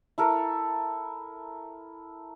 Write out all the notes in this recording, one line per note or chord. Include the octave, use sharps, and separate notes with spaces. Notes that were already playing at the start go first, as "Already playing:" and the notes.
E4 A4 A#4